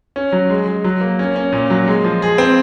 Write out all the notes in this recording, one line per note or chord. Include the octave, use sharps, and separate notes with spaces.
C#4
F#3
G#3
G#3
F#3
A#3
C#4
C#4
A#2
F#3
G#3
F3
G#4
C4